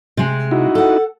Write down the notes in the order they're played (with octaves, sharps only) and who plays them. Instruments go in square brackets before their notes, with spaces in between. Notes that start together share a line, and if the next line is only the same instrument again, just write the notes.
[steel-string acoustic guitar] C3 G#3
[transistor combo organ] D#4 E4 F#4
[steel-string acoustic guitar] A4 F#5